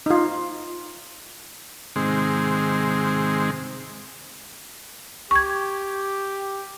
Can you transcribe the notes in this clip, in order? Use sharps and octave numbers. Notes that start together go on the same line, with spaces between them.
D#4 F4
G#2 C3 D#3 G#3 C4
G4 C#6 G#6